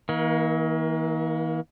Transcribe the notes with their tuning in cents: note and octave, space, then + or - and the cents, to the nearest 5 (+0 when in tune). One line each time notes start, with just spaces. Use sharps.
E3 -45 A#3 +20